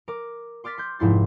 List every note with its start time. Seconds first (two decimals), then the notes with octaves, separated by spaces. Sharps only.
0.08 A#4 D6
0.64 C6 D6 F6 A6 B6
0.78 C6 G6
0.99 F1 G#2 E4 C6 A6